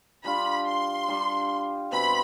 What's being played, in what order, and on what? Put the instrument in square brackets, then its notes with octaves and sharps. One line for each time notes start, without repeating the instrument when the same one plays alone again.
[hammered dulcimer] G3 D4 F4 [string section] B5
[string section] C6
[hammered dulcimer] G3 D4 F4
[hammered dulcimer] B2 G3 C4 [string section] B5